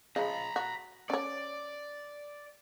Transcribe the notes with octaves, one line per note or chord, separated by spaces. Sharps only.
C#3 F3 G#3 A#5 B5
F#4
C#4 C#5 D5